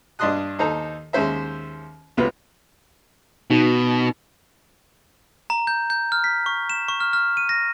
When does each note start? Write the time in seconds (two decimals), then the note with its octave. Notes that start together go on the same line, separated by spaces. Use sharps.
0.19 G2 D4 D#5 C6 D#6 F#6
0.59 D#2 D#4 A4 C5 A#5
1.13 D#2 G#3 C#4 C5 E5
2.17 C#2 C3 B3 F4 B4
3.50 B2 D#4 F#4
5.50 A#5
5.67 G6
5.90 G6
6.12 F6
6.24 B6
6.46 C#6
6.70 E7
6.89 C#6
7.00 F6
7.13 F6
7.37 D#7
7.49 A#6